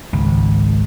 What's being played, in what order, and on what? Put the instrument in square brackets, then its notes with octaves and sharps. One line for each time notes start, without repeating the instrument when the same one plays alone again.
[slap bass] G#1 C#2